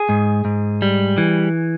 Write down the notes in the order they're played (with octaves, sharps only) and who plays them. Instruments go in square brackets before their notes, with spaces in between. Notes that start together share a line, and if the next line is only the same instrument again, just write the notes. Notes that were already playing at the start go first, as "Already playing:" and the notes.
Already playing: [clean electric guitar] G#4
G#2
G#2
G3
E3